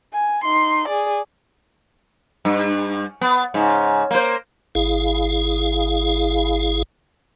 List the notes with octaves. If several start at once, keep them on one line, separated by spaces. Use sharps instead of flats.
G#5
D#4 C6
G#4 D5
G2
B3
G#2 C#3
A#3 C5
G#1 E4 G#4 F5